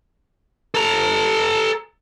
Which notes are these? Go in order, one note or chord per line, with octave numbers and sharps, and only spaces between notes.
A4 A#5